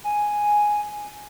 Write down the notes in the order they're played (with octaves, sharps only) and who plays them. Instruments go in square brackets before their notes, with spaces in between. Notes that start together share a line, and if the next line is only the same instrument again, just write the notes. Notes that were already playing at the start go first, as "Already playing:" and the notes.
[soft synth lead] G#5